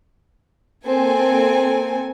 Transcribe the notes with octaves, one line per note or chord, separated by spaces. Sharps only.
A#3 C4 A4 G#5